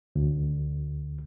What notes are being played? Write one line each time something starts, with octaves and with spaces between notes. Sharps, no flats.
D2